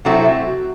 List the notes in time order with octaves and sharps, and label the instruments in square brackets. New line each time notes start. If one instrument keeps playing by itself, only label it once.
[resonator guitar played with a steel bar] C3 F#3 A3 C4 E4 [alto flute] F#5
[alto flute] E5
F#4